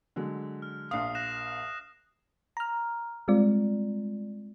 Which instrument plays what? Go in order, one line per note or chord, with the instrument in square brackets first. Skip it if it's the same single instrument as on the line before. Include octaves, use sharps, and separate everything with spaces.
[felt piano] D3 F#3 G#3
[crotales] F6
[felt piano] A#1 F5 [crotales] D#6 C7
[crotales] F#6 A#6 E7
[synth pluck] A#5 F6
G3 G#3 C4 F4 D5